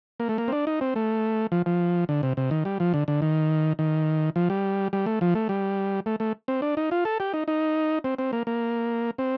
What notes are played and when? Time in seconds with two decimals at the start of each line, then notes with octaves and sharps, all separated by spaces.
0.20 A#3
0.29 A3
0.38 A#3
0.48 C4
0.52 D4
0.67 D#4
0.81 C4
0.96 A3
1.52 F3
1.66 F3
2.09 D3
2.23 C3
2.37 C3
2.51 D#3
2.65 G3
2.80 F3
2.94 D3
3.08 D3
3.22 D#3
3.79 D#3
4.36 F3
4.50 G3
4.93 G3
5.06 A3
5.21 F3
5.35 A3
5.49 G3
6.06 A3
6.20 A3
6.48 C4
6.62 D4
6.77 D#4
6.91 F4
7.05 A4
7.20 G4
7.34 D#4
7.48 D#4
8.04 C4
8.19 C4
8.33 A#3
8.47 A#3
9.18 C4